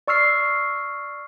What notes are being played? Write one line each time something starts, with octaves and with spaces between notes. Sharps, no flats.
D5 C#6 E6 F6 C7